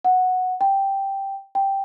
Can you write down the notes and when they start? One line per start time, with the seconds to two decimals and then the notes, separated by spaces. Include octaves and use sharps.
0.05 F#5
0.61 G5
1.55 G5